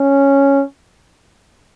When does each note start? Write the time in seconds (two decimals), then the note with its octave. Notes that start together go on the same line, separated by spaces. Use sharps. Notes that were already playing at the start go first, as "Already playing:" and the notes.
Already playing: C#4